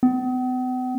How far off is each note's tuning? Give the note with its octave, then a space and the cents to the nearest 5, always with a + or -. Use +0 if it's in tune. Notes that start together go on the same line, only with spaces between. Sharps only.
B3 +45